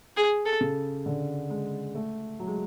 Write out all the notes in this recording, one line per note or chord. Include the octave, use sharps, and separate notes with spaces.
G#4
A4
C#3
D3
G#3
A3
F#3
G#3